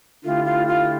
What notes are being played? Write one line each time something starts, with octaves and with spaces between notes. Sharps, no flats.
D3 A3 E4 F4 G4
F4
F4